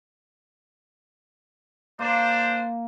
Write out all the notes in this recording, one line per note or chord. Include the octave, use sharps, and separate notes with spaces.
A#3 D4 C5